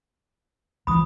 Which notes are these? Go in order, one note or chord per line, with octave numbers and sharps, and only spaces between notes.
C#2 E3 F3 B5 D#6